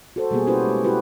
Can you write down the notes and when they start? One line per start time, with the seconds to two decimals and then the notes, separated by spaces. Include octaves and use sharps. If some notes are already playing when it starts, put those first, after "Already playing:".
0.16 F#4 A4 C5
0.31 B2 G3 A#3 B3 G4 G#4
0.47 C#4 E4 F#4 G4 B4 C5
0.64 G#3
0.84 E4 F#4 G4 B4